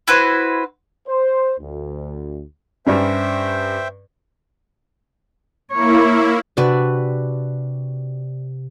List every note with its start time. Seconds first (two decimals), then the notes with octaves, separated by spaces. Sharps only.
0.08 E4 F#4 B4 C5
1.08 C5
1.60 D2
2.86 G2 G3 C#4 C5 E5 G5
5.72 A#3 E4 C#5
6.57 C3 D4 F#4 B4 D5